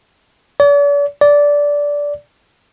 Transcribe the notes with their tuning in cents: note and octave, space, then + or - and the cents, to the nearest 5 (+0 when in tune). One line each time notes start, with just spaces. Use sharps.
D5 -45
D5 -15